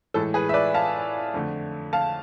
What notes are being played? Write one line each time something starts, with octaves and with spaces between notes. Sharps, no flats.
A2 E3 G#3 A4
G#4 B4
E5
B4 D5
F5 A5
F2 D3 A3
F5 A5